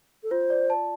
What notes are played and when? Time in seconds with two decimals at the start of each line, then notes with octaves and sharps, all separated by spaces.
0.23 A4
0.31 F4 C5
0.50 D5
0.70 A5